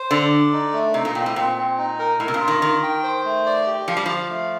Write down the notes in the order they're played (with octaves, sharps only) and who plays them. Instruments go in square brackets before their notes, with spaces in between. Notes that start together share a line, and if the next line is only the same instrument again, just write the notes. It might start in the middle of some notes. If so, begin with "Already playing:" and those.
Already playing: [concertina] C5
[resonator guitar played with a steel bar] D3 [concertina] D5
[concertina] D5
D#4
A3
[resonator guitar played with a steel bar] C3 [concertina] D#4
[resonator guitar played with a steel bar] A#2
[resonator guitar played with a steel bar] A#2 [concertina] C4
[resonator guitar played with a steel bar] A2
[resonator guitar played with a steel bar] A#2 [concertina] C4
[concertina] C4
D#4
A#4
[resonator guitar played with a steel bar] A2 [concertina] A#4
[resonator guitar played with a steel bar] C3
A#2
[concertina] F4
[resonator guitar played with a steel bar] D#3
[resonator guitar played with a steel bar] D#3 [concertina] A#4
[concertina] G5
C5
A3
D5
G4
[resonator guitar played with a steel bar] F3 [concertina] F5
[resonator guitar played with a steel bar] G3
[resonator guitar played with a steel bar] F3 [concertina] F5
[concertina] A3